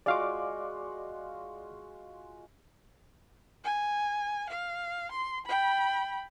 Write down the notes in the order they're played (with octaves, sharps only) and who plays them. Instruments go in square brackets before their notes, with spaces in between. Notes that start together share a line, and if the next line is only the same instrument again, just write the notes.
[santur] G#3 F4 F#4 [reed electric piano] D5 F5 D6
[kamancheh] G#5
F5
C6
G5 B5